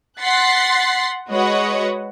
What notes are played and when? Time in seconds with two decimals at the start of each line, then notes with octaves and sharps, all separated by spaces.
0.21 F#5 C6 F#6 A6 B6 C7
1.29 G#3 F#4 B4 C#5 D#5 F#5